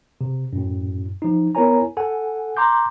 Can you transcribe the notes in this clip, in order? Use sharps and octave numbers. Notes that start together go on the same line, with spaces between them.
C3
F#2 A2
F3 D#4
B3 E4 A#4 C#5 G#5 A#5
A4 F#5 G#5
A#5 C6 D6 G6